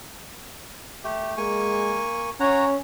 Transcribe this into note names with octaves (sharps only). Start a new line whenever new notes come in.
A3 G4
G#3 A#3 G#5 C#6
C#4 C#5 F#5 A#5